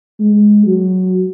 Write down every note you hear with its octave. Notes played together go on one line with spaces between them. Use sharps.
G#3
F#3